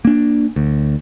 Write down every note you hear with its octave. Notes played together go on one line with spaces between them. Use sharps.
A#3 D4
D2